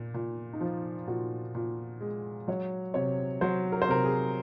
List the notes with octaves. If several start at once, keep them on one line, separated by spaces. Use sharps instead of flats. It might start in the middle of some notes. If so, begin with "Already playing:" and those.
Already playing: A#2
A#2
D#4
F3 F4
A#2 F#4
A#2
G#3
F#3 C#5
C3 C#5
F#3 C5
A#4
C5
C3 A#4
G#4